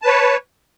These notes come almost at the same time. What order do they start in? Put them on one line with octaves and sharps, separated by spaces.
A5 B4 C#5